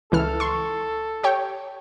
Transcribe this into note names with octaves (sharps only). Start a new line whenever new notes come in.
C#2 E3 A4 F6
C6 C#6
G4 C#5 G5